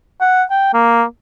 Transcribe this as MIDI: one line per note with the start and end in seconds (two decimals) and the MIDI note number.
0.21 0.43 78
0.50 0.69 79
0.74 1.04 58